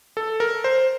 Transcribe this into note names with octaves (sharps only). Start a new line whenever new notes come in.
A4
A#4
C5